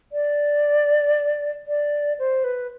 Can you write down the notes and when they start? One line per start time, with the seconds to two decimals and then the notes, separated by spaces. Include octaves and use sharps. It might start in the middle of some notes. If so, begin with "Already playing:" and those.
0.12 D5
1.67 D5
2.19 C5
2.44 B4